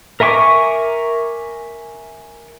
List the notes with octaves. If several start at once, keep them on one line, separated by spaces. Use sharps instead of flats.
A#4 E5 G#5 C#6 D6